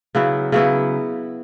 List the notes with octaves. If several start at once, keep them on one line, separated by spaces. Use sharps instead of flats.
C#3 F#3 B3 E4
C#3 F#3 B3 E4